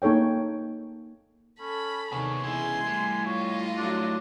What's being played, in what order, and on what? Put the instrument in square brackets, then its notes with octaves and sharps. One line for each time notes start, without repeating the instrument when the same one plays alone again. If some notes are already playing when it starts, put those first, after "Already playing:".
[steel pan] A#3 D#4 A4 C#5 G5
[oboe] C#4 [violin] A4 B5
[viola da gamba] C3 D#3 [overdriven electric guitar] B3 G#4 [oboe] C#5
[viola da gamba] E2 E4 [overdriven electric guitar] C#3 G#3 [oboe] G#5 [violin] C6
[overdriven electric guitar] A2 [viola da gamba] G3
[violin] F4 D#5 [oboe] C#5
[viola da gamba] F#3 A3 [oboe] D4